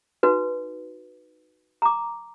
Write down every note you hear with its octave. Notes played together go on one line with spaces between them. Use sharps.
D#4 F#4 B4
A#5 D6